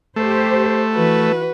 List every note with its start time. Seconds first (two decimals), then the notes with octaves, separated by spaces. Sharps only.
0.16 A3 G4 C5
0.94 E3 F#4 B4